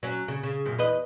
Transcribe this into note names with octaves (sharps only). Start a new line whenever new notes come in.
F#3 C#4
C#3
C#3
F#2 A#2
E2 B4 D#5